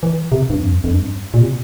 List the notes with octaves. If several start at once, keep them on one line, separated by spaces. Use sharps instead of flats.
E3
C3
G2
F2
F2
G2
A#2
C3